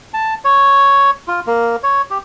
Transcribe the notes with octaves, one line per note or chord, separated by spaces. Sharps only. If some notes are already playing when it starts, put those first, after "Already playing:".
A5
C#5
F4
A#3
C#5
G4